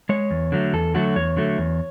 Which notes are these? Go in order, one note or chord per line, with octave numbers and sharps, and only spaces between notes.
G#3 C#5
E2
D3 F#3 A3
E2 A4
D3 F#3 A3 F#4
E2 C#5
D3 F#3 A3
E2